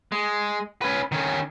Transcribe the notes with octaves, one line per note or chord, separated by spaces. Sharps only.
G#3
C#4 B4
D#3 C#4